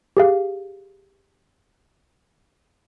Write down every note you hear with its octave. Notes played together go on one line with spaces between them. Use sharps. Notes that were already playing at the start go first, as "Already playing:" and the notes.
G4 G#4 F5